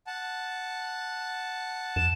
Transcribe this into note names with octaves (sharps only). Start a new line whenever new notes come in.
F#5 A5
F2 E7